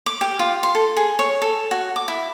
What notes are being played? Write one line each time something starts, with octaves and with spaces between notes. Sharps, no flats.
D6
G4
F4
C6
A4
G#4
C#5
A4
F#4
D6
E4